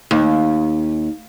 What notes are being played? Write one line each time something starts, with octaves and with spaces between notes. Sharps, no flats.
D#2